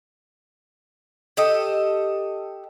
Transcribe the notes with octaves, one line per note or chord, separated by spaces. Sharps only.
G4 A4 D#5